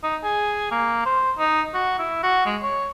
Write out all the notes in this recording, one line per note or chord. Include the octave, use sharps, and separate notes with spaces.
D#4
G#4
A#3
C5
D#4
F#4
E4
F#4
G#3
C#5